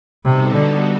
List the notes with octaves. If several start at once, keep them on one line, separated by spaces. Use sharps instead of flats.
C3 G3 B3 D#4 F#4 A4
D3